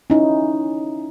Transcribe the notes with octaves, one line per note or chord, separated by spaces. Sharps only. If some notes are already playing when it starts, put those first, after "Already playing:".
C#4 D#4 E4